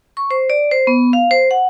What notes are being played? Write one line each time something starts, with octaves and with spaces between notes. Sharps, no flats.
C#6
C5
D5
C5
B3
F5
C5
F#5